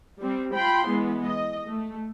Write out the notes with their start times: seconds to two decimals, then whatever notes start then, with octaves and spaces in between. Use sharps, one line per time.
0.20 G3 C4
0.55 F4 G5 B5 C6
0.88 E3 G#3 B3
1.26 D#5
1.68 A3